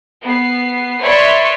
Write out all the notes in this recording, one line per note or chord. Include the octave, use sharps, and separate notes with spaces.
B3 C7
B4 C#5 D5 E5 B5 C6